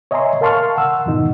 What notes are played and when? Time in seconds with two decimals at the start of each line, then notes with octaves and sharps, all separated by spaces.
0.11 C#5 D#5 E5 G#5 A#5 C6
0.41 A#4 F5 A5 C6 C#6 F6
0.76 F#5 E6
1.06 F2 G#2 B2 D#3 D#4